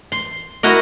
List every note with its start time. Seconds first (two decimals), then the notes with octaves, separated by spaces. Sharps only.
0.12 C6
0.63 E4 F#4 A#4 D#5